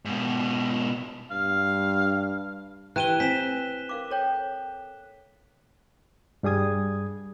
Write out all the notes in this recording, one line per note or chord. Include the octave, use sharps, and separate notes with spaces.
G#2 B2
G2 F5
E3 G4 G5 A#5 F#6 D#7 G7
C4 G#5 B6 E7
A#4 F5 D6
A4 C#5 G5
G2 G3 G#4 D#6 G#6